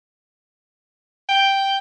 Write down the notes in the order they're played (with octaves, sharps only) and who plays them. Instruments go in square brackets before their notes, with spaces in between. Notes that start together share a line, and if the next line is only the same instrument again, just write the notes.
[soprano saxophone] G5